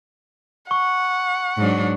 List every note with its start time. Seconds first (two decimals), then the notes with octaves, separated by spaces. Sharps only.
0.71 F#5 C#6
1.58 G#2 F#3 D4